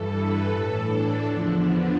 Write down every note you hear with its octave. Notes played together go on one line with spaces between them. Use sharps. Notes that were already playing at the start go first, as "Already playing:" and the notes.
Already playing: G2 E3 A4
B4
A2 E3 A4
D4
E2 D3 F3
B3